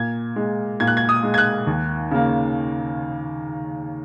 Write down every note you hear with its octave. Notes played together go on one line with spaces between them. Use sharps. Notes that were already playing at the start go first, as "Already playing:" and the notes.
Already playing: A#2 G#6
G#3
A#2 G#6
F#6
G#6
D#6
G#3
G#6
F#6
D#2
C#3 A#3